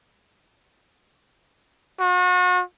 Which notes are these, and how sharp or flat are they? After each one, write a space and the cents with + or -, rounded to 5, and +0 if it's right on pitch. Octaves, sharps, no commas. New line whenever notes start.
F#4 -40